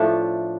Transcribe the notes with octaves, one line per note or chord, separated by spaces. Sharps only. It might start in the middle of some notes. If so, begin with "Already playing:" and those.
Already playing: A2 F3 A3 D4